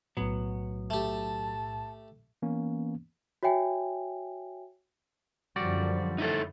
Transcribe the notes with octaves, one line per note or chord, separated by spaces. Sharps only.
B1 A2 F#3 B3
A3 G4 A5
E3 A#3 B3 C#4
F#4 C#5 E5 G5 G#5
F#2 D3 F3 G3 F#4 D5
D#4 E4 A4